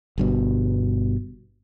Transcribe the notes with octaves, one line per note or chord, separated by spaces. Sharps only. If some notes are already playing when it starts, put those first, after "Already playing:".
G1 G2 B2